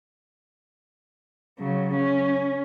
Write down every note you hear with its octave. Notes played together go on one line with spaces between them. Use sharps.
C#3 F#3
C#4